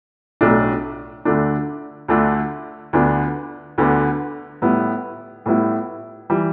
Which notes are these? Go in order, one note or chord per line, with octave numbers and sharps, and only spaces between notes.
B1 A2 A3 D4
D2 D3 A3 D4
D2 D3 A3 D4
D2 D3 B3 D4
D2 D3 B3 D4
A2 G3 B3 E4
A2 G3 B3 E4
E3 G3